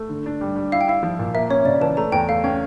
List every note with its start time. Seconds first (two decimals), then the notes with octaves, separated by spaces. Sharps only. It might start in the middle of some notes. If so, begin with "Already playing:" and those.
Already playing: A3
0.09 D3
0.26 D4
0.41 G3
0.56 G3
0.72 E4 F5
0.81 G5
0.88 E4 F5
1.03 F3
1.19 A#2
1.34 A#3 E5
1.50 C#4 C#5
1.65 C#3 D5
1.81 E3 A5
1.97 A3 A#5
2.12 E2 G5
2.29 A3 F5
2.44 C#4 G5